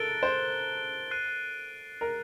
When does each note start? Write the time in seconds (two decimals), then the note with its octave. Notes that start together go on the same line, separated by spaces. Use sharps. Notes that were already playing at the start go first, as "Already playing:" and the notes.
Already playing: A4 A#4 F#6 A6 D7 G7
0.23 C5
1.11 F#6 C7 D#7 G7
2.01 A#4